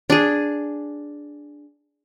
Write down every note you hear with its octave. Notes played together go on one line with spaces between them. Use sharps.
D4 G#4